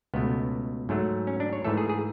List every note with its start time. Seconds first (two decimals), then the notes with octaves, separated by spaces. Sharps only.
0.14 C#2 B2 A3 B3
0.89 G#2 F#3 A3
1.27 C#4
1.40 D4
1.53 C#5
1.65 G#2 E3 A3 A4
1.77 G#4
1.89 G#4